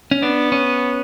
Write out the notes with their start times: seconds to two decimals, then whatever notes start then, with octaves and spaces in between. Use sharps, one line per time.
0.11 C#4
0.22 B3 D4
0.52 C#4